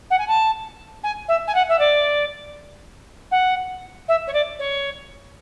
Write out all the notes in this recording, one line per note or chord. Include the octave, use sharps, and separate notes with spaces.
F#5
G#5
A5
G#5
E5
G#5
F#5
E5
D5
F#5
E5
C#5
D5
C#5